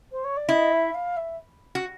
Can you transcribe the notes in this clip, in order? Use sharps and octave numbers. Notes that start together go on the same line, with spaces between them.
C5
C#5
D5
E4 D#5
E5
F5
E5
F#4